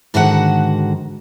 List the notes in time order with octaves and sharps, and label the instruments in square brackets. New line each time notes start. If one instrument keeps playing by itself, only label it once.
[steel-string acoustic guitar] G#2 D3 D#3 F#4 C5 F#5